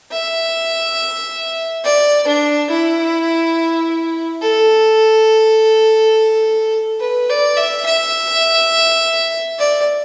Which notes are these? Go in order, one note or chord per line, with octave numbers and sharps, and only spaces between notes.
E5
D5
D4
E4
A4
B4
D5
E5
E5
D5